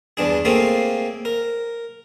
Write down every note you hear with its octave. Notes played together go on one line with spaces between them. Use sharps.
E2 G2 D4 G#4
A3 A#3 C4 F4 G#4 C#5
A#4